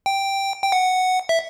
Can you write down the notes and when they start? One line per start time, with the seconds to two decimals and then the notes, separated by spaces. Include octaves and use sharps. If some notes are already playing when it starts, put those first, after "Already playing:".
0.06 G5
0.63 G5
0.72 F#5
1.29 E5